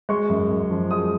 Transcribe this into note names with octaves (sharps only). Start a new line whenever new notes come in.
G#3 C#6
F#2
F#2
F3
G#3 D#6